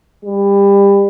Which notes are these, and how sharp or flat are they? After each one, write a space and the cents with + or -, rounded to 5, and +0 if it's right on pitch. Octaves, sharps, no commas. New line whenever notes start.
G3 +25